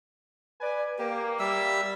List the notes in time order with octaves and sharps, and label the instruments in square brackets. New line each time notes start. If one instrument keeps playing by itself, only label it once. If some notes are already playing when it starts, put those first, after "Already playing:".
[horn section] B4 D5 G#5
[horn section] A#3 [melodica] G4
[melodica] G3 E5 E6